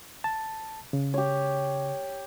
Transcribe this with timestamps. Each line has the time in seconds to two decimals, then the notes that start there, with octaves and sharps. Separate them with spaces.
0.24 A5
0.93 C#3
1.14 G4 C#5